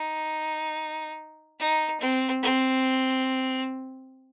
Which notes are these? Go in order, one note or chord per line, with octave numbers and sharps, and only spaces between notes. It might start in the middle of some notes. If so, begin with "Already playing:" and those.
Already playing: D#4
D#4
C4
C4